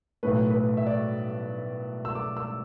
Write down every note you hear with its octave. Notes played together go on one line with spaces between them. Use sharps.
B1 A2 A3 B4
B4
E5
D5
E6
D6
E6